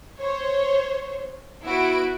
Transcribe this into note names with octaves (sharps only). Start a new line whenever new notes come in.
C5 C#5
B3 E4 F#4 D7